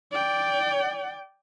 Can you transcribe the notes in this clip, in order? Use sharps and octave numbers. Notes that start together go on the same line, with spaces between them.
D5 G5